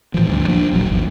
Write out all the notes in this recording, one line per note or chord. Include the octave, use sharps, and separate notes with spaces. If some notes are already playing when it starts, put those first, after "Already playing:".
A2 E3 F3
D2 G2
F3 A#3 D4
D#1 A#1 G#2 F#3
G#1 E2